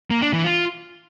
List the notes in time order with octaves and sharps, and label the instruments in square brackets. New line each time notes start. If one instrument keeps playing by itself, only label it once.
[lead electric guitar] A#3
D4
E3
F4